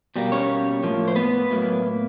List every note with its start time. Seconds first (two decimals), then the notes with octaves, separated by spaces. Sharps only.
0.16 B2 G3 A#3
0.32 C#4 C#5
0.83 A2 F3 A#3
1.08 C5
1.16 B3 B4
1.50 A2 F#3 A#3